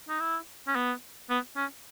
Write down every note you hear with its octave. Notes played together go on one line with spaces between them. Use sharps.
D#4
E4
C#4
B3
B3
C#4